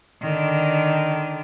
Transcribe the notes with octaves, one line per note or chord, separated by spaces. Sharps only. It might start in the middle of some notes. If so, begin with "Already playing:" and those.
D3 D#3